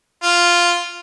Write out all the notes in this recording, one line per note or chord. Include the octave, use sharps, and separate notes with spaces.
F4